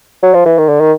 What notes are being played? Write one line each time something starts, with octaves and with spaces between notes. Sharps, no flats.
F#3
F3
E3
D#3
D3
D#3